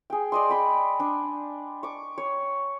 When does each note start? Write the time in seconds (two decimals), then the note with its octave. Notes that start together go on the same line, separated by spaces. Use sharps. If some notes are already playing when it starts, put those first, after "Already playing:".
0.10 G#4 G5
0.32 D5 D#5 C6
0.49 G5 B5 C6
1.00 D4
1.83 C#6 D6
2.18 C#5